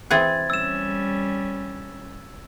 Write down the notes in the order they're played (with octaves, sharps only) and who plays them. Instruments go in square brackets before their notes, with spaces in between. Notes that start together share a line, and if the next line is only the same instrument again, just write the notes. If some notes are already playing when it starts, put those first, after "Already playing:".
[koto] E3 C4 G#4 [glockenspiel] F#6 G#6 A6
[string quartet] G3 C#4 [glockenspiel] E6 E7